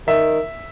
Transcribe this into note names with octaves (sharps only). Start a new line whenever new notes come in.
D#3 E5